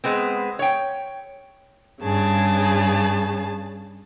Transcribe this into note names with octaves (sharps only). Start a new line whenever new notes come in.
G#3 B3 C4
C#5 G5
G2 C#3 G#4 A5